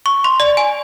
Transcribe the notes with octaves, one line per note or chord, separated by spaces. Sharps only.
C#6
C6
D5
G#5